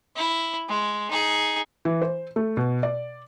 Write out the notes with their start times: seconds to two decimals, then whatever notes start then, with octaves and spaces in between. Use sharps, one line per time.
0.16 E4
0.69 G#3
1.11 D#4 G#4
1.85 E3
2.01 C5
2.36 A3
2.57 B2
2.83 D5